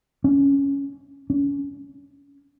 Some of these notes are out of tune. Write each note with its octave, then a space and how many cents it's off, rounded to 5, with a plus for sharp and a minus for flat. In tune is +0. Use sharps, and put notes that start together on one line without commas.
C#4 +5
C#4 +30